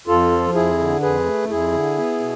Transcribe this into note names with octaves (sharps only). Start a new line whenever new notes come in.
F2 F4 A4
F3
F2 E4 G#4
D3
F2 G#4 B4
A3
F2 E4 G#4
D3
B3
B2